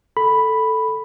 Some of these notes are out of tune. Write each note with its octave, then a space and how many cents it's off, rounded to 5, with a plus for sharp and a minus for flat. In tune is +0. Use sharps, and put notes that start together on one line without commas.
A4 +0 B5 +0